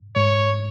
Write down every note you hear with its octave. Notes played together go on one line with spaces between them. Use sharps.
G#2 C#5